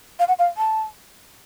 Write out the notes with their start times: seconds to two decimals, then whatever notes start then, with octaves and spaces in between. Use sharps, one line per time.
0.19 F5
0.28 F#5
0.39 F5
0.57 A5